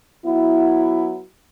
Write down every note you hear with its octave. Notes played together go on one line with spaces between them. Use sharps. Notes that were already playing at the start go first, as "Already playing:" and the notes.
F#3 B3 E4